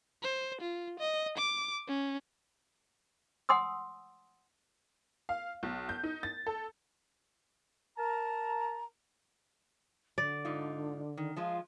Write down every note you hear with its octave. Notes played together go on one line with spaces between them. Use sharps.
C5
F4
D#5
D6
C#4
F#5 G#5 C6 D#6 E6
F5
B1
G6
D#4
A6
A4
A#4 A5 A#5
D3 D5
G#2 D#4 F4
D#3
F3 G#3 F4 F5